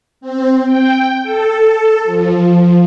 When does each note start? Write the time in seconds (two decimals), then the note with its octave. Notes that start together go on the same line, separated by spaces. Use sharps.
0.21 C4
0.64 G5
1.23 A4
2.05 F3